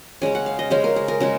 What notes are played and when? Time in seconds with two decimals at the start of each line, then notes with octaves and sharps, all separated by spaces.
0.22 C#3 G#3 C#4 G#5
0.35 F#5
0.46 F5
0.59 D#5
0.71 C#3 G#3 C#4 C5
0.84 A#4
0.96 G#4
1.08 A#4
1.20 C#3 G#3 G#4